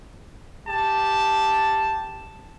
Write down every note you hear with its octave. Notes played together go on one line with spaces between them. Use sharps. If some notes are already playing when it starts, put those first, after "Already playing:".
G4 A5